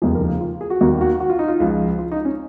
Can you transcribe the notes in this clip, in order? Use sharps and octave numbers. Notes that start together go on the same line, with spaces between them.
F1 D#2 C#3 F3 G#4
A#4
G#4
F4
G#4
F#4
D#2 D#3 F#4
F#4
F#4
F4
D#4
F4
C#2 C#3 F3
F4
D#4
C#4